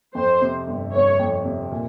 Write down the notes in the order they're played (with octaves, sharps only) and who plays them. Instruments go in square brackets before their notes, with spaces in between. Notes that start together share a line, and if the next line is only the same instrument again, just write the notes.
[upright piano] F2 [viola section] C5
[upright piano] C3
G1
[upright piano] G1 [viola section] C#5
[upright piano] F2
C3
A#2